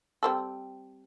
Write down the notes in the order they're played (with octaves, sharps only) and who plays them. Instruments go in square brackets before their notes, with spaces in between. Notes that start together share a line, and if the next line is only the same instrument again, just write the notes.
[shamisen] G3 C4 A4